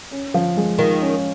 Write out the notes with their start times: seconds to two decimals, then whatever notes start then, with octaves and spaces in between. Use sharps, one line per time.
0.11 C#4
0.34 F3
0.57 G#3
0.79 D#3 F4
1.02 C#4